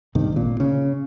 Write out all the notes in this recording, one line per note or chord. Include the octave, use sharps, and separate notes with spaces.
A#1 G2 C3 D#3
G#1 A#2
C#3